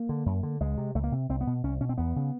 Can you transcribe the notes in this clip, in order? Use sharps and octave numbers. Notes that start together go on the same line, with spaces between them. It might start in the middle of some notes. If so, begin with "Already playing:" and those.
Already playing: A#3
D3
F#2
D3
C#2 G#3
C3
C#2 A3
A#3
C3
C2 C4
B3
B2
C2 C#4
B2 C#4
C4
E2 B3
C#3